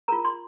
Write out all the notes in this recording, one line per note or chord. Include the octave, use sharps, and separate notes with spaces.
F4 A#4 A#5
C6